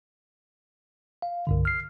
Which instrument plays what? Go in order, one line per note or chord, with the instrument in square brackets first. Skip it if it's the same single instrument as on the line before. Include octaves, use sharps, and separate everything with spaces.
[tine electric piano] F5
C2 G2 D3
F6 C7